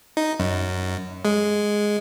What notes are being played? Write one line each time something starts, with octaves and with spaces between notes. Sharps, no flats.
D#4
F#2
G#3